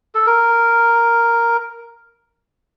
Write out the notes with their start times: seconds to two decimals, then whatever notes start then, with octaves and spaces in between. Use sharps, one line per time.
0.15 A4
0.27 A#4